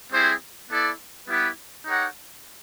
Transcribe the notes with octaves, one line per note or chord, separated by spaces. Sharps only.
G3 C4 E4 G#4 C5
B3 E4 A4 D5
G3 B3 E4 G4 B4
D#4 G4 A#4 C#5 F#5